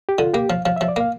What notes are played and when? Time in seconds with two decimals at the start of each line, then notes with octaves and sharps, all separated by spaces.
0.09 G4
0.18 D3 F4
0.34 A#3 G4
0.50 F3 F5
0.65 F3 F5
0.76 F3 E5
0.88 D5
0.96 A#3 F5